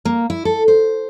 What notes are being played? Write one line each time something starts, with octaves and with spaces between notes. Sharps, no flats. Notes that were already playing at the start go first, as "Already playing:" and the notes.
A#3
E4
A4
C5